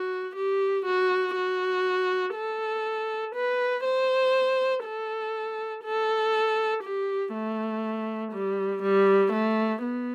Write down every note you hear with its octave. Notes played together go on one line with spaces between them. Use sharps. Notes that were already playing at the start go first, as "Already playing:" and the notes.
Already playing: F#4
G4
F#4
F#4
A4
B4
C5
A4
A4
G4
A3
G3
G3
A3
B3